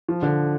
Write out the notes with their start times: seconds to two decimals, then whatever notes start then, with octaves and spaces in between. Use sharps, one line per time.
0.09 F3
0.22 D3